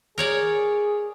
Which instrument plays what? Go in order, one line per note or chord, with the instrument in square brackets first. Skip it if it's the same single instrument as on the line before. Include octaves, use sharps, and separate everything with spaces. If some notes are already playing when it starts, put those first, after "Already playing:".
[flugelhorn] G#4 [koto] A#4 C#5 D5